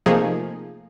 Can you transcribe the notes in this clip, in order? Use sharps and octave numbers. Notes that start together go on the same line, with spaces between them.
C3 F3 A3 A#3 D#4 G#4